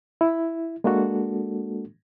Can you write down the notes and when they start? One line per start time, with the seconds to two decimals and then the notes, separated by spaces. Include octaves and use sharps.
0.21 E4
0.84 G#3 A#3 D4 F#4 A4